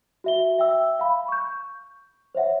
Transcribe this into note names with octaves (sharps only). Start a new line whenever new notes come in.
F#4 E5 G7
E5 G5 E6
F5 B5
C#6 G6
C5 C#5 E5 F#5